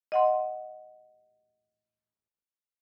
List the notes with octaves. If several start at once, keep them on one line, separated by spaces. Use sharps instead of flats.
D#5 F#5 C6